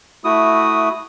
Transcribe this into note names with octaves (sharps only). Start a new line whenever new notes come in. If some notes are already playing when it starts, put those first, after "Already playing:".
A3 E4 F#4 D#6